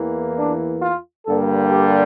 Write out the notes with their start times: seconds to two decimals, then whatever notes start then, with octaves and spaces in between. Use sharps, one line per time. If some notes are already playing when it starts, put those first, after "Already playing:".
Already playing: E2 E3 A#3
0.38 D4
0.82 F4
1.26 G2 D3 G3 A#3 A4
1.70 G4